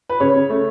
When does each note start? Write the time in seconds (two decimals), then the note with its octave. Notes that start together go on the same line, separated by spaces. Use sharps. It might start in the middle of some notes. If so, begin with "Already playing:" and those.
0.09 B4
0.20 C#3 C#5
0.34 C#3
0.50 A3